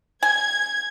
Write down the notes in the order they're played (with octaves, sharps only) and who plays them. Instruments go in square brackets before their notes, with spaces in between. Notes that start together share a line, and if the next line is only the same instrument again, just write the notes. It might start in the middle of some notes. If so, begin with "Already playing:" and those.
[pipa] G#5 [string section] G#6